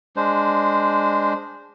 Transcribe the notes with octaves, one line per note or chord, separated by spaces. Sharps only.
G#3 D4 C5